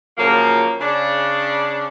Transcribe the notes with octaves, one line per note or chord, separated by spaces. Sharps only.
A#2 C#3 F3 F#3 A#3
C#3 D4